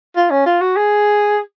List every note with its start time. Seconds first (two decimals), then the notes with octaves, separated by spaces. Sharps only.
0.16 F4
0.30 C#4
0.46 F4
0.61 F#4
0.76 G#4